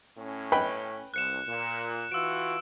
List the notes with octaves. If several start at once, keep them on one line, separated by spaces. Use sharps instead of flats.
A2 C#4
B4 G5 B5
C2 F#6 C#7 E7
A#2
E3 F4 F#4 E6 D7